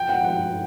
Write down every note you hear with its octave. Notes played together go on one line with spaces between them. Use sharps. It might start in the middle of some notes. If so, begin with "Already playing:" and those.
Already playing: G5
F#5
F#5